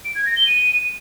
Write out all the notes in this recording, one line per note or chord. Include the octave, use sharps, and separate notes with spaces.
D7
G#6
A#6
G7
D#7